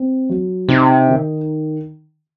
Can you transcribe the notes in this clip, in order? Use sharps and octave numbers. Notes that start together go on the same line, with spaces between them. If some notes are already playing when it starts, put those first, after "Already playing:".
Already playing: C4
F#3
C3 D#4
D#3